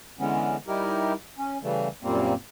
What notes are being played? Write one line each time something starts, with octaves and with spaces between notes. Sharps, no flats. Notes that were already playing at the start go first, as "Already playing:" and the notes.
D3 E3 G#3 B3 C#4
G3 D#4 E4 G4 A#4
C#4
C#3 E3 G3 A3
F#2 A#2 G3 A#3 C4